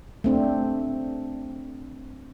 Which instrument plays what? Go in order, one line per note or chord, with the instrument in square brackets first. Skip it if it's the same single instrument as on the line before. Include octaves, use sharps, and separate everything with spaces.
[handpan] A3 C4 D4